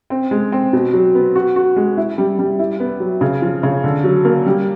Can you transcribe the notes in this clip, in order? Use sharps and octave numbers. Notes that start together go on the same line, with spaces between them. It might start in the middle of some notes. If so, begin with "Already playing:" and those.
C4
G#3
C4
B2
F#3
B3
F#4
F#4
G#3
E4
G3
G3
E4
B3
F#3
C#3
F3
C#3
D3
F#3
A#3
G3